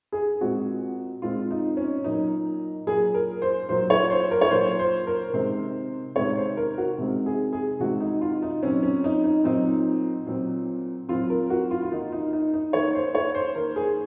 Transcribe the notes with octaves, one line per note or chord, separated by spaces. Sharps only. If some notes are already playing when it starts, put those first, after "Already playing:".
G#4
A#2 G#3 C4 F#4
A#2 G#3 C4 F4
D#4
C#4
A#2 F#3 A#3 D#4
A#2 F#3 A#3 G#4
A#4
C5
A#2 F#3 A#3 C5
C#5
C5
A#4
C#5
A#2 F#3 A#3 C5
C5
A#4
C3 D#3 G#3 C4 C5
C3 D#3 G#3 C4 C#5
C5
A#4
F#4
C3 D#3 G#3 C4
G#4
G#4
C3 D#3 G#3 C4 F#4
D#4
F4
D#4
A#2 F#3 C4 C#4
C#4
D#4
D#4
A#2 F#3 C4 D#4
A#2 F#3 C4
A#2 F#3 C4 F4
A#4
F#4
F4
F4
D#3 A#3 D#4
D#4
D#4
D#4
D#3 A#3 C#5
C5
C#5
C5
D#3 A#3 A#4
G#4